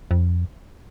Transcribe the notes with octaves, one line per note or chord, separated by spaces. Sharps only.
F2